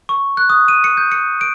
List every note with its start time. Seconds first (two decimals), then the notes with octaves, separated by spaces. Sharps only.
0.09 C#6
0.37 F#6
0.50 D#6
0.68 D#7
0.84 C#7
0.97 G6
1.12 C#7
1.41 D7